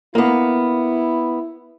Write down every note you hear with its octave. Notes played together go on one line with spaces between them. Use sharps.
A#3 B3 E4